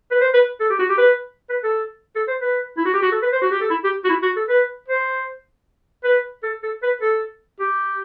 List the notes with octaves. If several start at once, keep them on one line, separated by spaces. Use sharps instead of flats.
B4
C5
B4
A4
G4
F#4
G4
B4
B4
A4
A4
C5
B4
E4
F#4
G4
F#4
A4
B4
C5
F#4
G4
A4
E4
G4
F#4
E4
F#4
A4
B4
C5
B4
A4
A4
B4
A4
G4